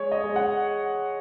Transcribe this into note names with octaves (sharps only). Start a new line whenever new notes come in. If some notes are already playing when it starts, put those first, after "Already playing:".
Already playing: G#3 C#5
D#5
G#3
F#5